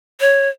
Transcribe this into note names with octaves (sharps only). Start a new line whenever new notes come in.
C#5